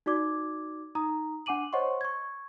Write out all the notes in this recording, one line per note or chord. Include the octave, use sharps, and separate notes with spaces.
D#4 F#4 D5 D6 G#6
D#4 A#5 D#6
D4 F#5 G#5 D6 D#7 F#7
C5 C#5 D#5 F#5 C6 C#6
C#6 G#6